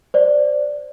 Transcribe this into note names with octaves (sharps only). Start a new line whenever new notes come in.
C5 D5